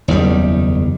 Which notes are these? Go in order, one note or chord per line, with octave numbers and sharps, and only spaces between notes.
F#1 E2 D#3 G3